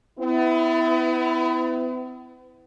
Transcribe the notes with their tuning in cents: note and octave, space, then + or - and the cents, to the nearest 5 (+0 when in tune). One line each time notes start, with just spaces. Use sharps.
B3 +40 E4 +0